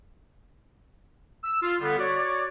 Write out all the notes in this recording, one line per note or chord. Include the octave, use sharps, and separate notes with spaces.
E6
F4
D3 G3 B3
F#4 C#5 D5